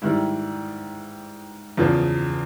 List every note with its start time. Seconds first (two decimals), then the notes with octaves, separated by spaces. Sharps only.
0.02 G#2 D#3 G3 E4
1.77 E2 C#3 F3